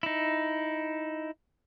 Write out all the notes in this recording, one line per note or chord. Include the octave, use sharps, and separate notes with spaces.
D#4 E4